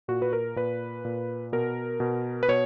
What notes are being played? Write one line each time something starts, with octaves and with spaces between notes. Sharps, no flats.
A#2 F#4
B4
A#4
A#2 B4
A#2
B2 A#4
B2
B4
B2 C#5